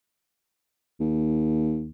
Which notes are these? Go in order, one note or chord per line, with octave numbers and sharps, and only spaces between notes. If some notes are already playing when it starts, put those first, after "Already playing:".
D#2